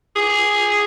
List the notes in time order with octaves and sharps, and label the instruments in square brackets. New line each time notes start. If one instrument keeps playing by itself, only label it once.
[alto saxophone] G#4